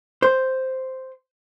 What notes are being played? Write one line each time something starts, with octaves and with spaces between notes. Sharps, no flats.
C5